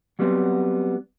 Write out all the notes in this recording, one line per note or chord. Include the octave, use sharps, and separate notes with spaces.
F#3 G3 B3 C4